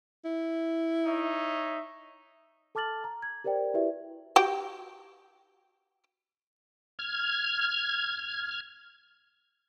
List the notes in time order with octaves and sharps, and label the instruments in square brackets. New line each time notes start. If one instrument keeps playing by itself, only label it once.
[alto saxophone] E4
[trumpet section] D#4 C#5 E5
[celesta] A4 A5 D6 F6 A6 F#7
A#5
G#6
G4 A#4 C5 D5 G5
E4 F#4 G4 B4 D5 E5
[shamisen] F#4 G4 G5
[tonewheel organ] F6 G#6